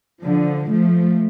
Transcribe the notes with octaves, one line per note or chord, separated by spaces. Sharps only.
D3 F3
F3 A3